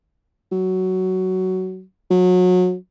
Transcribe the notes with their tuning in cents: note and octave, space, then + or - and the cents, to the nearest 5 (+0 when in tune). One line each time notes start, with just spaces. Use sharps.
F#3 +10
F#3 -30